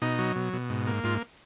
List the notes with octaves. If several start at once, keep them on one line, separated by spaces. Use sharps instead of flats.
B2 D#4
F#3
B2
B2
G#2
A#3
G#2 F4